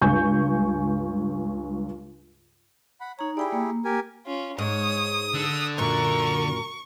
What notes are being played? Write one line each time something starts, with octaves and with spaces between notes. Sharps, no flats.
C#2 G2 G#5 C#6 G6
F#5 B5
D#4 C#5 A#5
E4 G4 G#4 D5 G5 B5
A#3
G4 A#4 G#5
C#4 F4
G#2 C#5 D#6
D3 E6
F#2 A#2 A#4 C#6